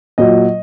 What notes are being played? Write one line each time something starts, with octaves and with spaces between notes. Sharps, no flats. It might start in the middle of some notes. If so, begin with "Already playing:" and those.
A#2 F#3 D#5